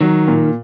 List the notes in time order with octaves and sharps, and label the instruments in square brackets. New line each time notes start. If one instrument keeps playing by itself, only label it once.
[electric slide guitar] D#3 [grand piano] F#3
[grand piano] A#2